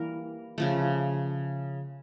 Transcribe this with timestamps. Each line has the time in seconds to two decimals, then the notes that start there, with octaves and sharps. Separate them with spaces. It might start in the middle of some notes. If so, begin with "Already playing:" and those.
Already playing: E3 G3 A#3 A#4
0.58 C#3 F3 A3